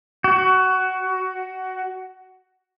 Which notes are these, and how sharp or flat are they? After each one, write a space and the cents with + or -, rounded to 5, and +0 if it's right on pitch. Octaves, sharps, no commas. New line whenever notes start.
F#4 +15